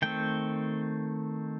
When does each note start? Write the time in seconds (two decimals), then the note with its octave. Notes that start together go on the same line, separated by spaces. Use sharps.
0.02 D#3 A3 C4 G5